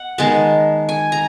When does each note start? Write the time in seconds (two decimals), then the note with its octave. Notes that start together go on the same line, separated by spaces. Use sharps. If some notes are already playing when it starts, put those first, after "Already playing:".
Already playing: F#5
0.18 D#3 G#3 B3 A5
0.89 G#5
1.12 A#5